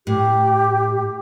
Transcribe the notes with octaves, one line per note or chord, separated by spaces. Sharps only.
A2 G4